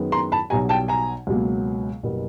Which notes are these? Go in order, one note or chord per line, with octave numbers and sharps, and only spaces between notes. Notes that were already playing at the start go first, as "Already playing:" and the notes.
Already playing: F#2 D#3 G#3 B3
A#5 C6
A5 B5
B1 B2 G3 G#5 A#5
G5 A5
G#5 A#5
C#2 B2 F#3 A#3
F#1 B2 G3 B3